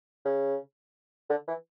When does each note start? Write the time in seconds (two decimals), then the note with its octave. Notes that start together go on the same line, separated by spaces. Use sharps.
0.25 C#3
1.30 D3
1.48 E3